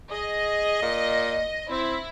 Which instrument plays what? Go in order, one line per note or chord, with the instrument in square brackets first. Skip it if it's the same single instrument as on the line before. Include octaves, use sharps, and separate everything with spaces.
[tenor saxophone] G#4 [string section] D#5
[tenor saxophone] A#2
[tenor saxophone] C4 [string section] E4